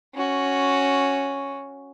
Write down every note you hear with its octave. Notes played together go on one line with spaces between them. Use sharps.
C#4 F#4